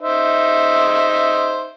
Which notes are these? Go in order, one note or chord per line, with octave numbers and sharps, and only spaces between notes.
D#4 C5 E5